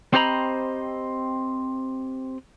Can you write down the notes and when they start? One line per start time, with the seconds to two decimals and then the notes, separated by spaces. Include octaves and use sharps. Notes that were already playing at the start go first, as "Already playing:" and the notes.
0.14 C4 G4 C5 D#5 A#5 B5